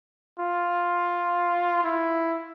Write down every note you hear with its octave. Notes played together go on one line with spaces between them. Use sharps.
F4
E4